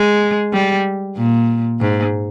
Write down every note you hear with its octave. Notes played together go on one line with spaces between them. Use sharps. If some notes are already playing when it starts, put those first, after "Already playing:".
Already playing: G#3
G3
A#2
G#2